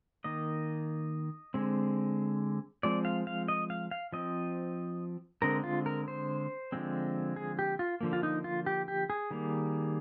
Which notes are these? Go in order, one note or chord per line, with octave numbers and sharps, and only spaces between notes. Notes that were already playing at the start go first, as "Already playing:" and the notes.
D#3 A#3 D#5
D3 G#3 C4
F3 G#3 C4 D5
F5
F5
D#5
F5
F5
F3 C4 D#5
D3 G#3 C4 A#4
F4
A#4
C5
D3 F3 G#3 C4
G#4
G4
F4
D3 F3 A#3
F4
D#4
F4
G4
G4
G#4
D#3 G3 A#3